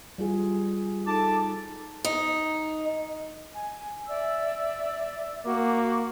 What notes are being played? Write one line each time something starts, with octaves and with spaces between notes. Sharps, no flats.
G3 F4 G#4
D#4 A4 A5 D6
D#4
G#5
D5 E5 E6
A#3 F#4 D6